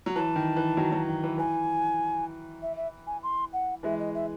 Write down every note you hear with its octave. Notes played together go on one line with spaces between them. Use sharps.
F#3
E3 A5
D#3
E3
D#3 F#3
D#3 F#3
D#3
E3
E3 G#5
E5
E5
G#5
C6
F#5
E3 G#3 E5
D#5
E5